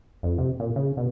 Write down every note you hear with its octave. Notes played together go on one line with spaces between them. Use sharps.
F2
C3
A#2
C#3
B2